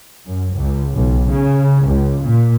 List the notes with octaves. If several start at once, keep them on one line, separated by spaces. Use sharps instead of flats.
F#2
C#2
B1
C#3
C#2
A#2